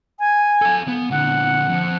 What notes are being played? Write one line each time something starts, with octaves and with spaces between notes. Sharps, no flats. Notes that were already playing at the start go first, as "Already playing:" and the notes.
G#5
A4 F5
B3
A#2 D3 F#5
F2